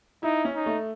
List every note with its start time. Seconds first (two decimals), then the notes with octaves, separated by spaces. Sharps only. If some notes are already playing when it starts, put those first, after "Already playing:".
0.23 D#4 E4
0.45 C#4
0.55 D#4
0.66 A3